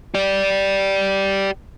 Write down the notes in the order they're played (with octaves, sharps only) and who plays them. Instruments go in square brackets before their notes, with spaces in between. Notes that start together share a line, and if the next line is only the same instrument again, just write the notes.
[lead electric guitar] G4 D5